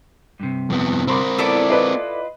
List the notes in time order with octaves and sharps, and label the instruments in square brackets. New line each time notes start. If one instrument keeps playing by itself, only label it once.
[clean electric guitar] G2 C3
[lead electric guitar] F2 B3
[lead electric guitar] C4 A#4 [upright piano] B5 C6 D6
[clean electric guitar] B3 [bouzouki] E4 A4 D5
[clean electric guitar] F4 [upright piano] B4 D#5